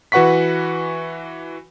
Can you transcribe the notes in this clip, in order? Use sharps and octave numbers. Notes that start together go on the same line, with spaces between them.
E3 F#4 B4 F#5 C#6 B6